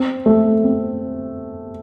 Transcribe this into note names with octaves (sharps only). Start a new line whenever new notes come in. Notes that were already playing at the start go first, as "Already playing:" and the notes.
Already playing: C4
A3
C4